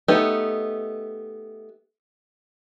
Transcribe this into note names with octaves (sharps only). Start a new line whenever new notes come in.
A3 B3 D#4 G4